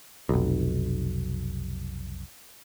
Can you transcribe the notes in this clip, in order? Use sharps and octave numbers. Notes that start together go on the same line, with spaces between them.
F1 B1